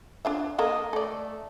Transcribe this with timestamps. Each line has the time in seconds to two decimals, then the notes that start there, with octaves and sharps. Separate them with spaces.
0.25 D4 F4 E5
0.58 A#3 A4 A#4 D#5
0.93 A3 A4 D5